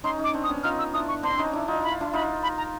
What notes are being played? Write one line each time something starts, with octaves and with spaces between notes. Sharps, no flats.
C#4 D#4 C6
C#4 D#4
D6
C4 D4
D#6
B3 C#4
D#4 F4 F6
E6
D4 E4 D#6
C#6
C4 D4 C6
C#4 D#4
D4 E4
D#4 F4
E4 B5
F4
D4 E4
D#4 F4 B5
B5
A#5